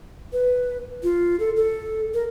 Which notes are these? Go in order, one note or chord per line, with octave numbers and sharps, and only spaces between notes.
B4
F4
A4
A4
A#4